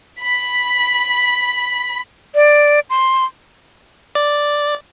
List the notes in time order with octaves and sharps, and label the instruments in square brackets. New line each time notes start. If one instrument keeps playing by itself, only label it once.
[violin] B5 B6
[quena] D5
C6
[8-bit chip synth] D5